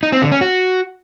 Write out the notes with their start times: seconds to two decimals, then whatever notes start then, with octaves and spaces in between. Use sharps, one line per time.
0.03 D#4
0.12 C4
0.22 D3
0.32 C#4
0.41 F#4